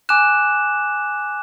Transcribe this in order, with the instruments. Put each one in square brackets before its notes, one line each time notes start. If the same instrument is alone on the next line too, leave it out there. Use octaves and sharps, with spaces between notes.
[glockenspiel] G#5 D6 F#6 E7